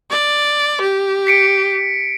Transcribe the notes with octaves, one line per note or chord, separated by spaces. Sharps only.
D5
G4
B6 C#7 D7